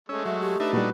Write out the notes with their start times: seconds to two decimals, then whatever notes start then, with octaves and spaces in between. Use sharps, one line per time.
0.09 G#3 A3 C#4 E6
0.25 F#3 E5
0.41 G4
0.60 A3 D4 D#4 B4 E5
0.73 A#2 G3 F#4 B4